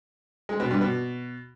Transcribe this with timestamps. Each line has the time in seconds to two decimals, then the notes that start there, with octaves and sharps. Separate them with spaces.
0.49 G#3
0.60 B2
0.71 G2
0.81 B2